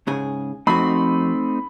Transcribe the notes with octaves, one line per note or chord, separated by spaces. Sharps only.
G#2 C#3 G#4
F2 A3 C4 D#4 F#4 B5